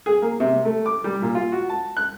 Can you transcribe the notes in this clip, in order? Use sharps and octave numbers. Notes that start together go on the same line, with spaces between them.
G#4
A#3
C3
A3
D6
G3
A#2
F4
F#4
A5
F#6